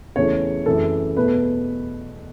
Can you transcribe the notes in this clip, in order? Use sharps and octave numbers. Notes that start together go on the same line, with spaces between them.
E2 C#3 E3 A3 C#5
F#2 C#3 E3 A3 A4
E2 B2 A3 B4